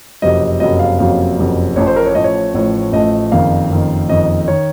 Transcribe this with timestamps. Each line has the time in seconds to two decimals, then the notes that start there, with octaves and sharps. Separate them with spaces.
0.22 F#1 F2 C3 F#3 D#5
0.60 F#1 F2 C3 F#3 D#5
0.79 F5
0.99 F#1 F2 C3 F#3 F5
1.39 F#1 F2 C3 F#3
1.76 A1 A2 F3 A3 C#5
1.87 C5
1.96 A#4
2.06 C#5
2.15 A1 A2 F3 A3 D#5
2.24 C#5
2.54 A1 A2 F3 A3
2.92 A1 A2 F3 A3 D#5
3.32 F#1 F2 D#3 F5
3.70 F#1 F2 D#3
4.09 F#1 F2 D#3 D#5
4.48 D#3 C#5